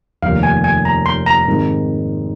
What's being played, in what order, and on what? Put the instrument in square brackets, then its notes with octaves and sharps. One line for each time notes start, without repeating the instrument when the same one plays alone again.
[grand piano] F1 D#2 D#3 [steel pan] F5
[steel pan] G#5
G#5
A#5
C6
A#5
[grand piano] G#2 D#3 C4 D#4